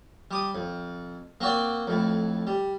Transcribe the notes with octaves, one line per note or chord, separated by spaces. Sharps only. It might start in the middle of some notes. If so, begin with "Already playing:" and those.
G3 D6 D#6
F2
A#3 C4 F#4 D5 G5
F2 A2
G3